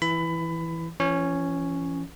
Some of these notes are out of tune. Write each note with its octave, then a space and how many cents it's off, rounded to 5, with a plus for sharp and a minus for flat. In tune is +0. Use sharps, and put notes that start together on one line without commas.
E3 +0 B5 +20
E3 +40 C#4 +0 C#5 +0